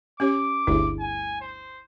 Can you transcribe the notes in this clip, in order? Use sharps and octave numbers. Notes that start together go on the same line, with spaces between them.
C#4 G4 C#5 D6
G1 D2 E4 G#4
G#5
C5